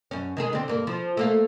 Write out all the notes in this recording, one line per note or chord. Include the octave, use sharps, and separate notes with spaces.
F#2 C#4
D#3 G#3 G#4
D3 C4
G2 A#3
F3
A3 A#3 F5